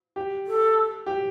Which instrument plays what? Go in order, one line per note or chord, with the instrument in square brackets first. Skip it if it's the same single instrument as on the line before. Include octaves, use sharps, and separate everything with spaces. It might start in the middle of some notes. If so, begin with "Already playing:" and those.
[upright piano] G4
[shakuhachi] A4
[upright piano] G4